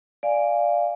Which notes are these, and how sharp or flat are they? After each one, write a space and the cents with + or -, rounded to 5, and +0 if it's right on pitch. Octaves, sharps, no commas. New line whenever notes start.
D5 +0 F5 -5 G#5 +0